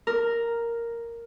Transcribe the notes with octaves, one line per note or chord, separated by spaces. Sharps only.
A#4